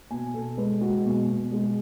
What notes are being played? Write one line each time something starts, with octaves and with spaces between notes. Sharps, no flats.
B2 G#5
B2 A4
G#3 B4
G#3 F#4
B2
B2
G#3 G#4